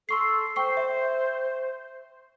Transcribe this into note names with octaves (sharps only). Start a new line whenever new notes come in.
A4 C6 C#6 C7
C5 G5 C#6 C7
E5